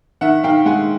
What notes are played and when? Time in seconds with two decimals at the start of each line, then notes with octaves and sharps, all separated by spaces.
0.21 D#3 E5 F#5
0.43 D#3 F5 G5
0.66 G#3 F#5 G#5